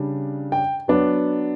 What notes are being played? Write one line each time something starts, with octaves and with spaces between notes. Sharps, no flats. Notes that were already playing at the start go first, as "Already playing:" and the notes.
Already playing: C#3 G3 D4
G5
F#3 B3 D4